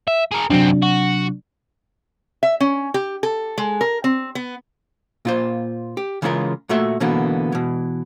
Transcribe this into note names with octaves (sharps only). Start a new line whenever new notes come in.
E5
G#4 A#4
F#2 C3 F#3 C4 D4
F#4
E5
C#4
G4
A4
G#3
A#4
C4
B3
A#2 F4 C5
G4
C#3 E3 G#3 C#4 F4 A#4
A#2 A3 F#4 E5 C6
B2 D3 E3 A#3 B3
B2 E3